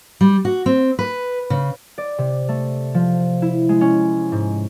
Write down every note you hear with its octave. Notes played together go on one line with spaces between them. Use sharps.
G3
F#4
C4
B4
C#3
D5
C3
A3
F3
E4
G#3
C#4
G#2